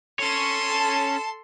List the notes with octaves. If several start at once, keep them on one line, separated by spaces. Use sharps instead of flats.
C#4 A4 C#5 C6
A5